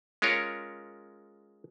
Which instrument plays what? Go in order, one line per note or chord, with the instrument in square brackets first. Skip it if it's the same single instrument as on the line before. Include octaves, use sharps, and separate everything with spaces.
[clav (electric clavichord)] G#3 C#4 F4 A#4 C#5